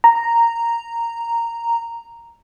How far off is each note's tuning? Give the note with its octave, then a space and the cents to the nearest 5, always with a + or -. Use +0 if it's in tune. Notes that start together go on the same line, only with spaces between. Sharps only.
A#5 -5